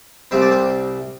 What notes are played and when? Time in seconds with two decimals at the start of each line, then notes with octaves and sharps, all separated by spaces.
0.31 C2 C3 G3 C4 C5
0.41 D5
0.51 C5